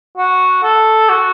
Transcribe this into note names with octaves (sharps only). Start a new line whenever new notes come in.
F#4
A4
F#4